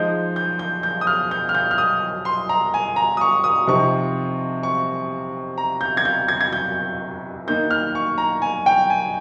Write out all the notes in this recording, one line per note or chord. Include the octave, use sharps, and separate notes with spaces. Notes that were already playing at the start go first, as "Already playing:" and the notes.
Already playing: F3 G#3 D#4 G6
G6
G6
G6
D#6
F6
G6
F6
G6
F6
D#6
C6
A#5
G#5
A#5
D#6
C#6
D#6
C3 F3 C4 D#4 C#6
C#6
A#5
G6
G#6
G6
G#6
G#6
G6
D#3 A#3 D#4 G6
F6
C#6
A#5
G#5
G5
G#5